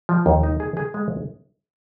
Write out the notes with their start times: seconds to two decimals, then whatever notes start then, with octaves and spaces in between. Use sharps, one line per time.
0.09 F3
0.26 D#2
0.43 D#4
0.60 G#4
0.77 G#4
0.94 G#3